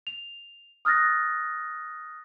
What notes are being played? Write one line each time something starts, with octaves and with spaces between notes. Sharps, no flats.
F7
D#6 F6 F#6 A6 A#6